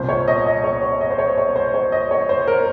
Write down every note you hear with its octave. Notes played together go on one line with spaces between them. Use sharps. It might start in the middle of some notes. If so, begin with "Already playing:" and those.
Already playing: C2 A#2 C5
C#5
D#5
D#5
C#5
C#5
D#5
C5
C#5
C#5
C5
C#5
D#5
C#5
C5
A#4